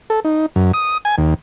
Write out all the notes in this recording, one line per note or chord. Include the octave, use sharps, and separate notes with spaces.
A4
D#4
F#2
D#6
G#5
D#2